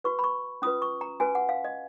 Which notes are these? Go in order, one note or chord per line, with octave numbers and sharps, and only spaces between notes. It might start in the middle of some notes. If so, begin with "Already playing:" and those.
F#4 B4 C#6
B5
C#6
C#4 F4 B4 D#6
C#6
A#5
C#4 F#4 B4 G#5
F#5
F5
D#5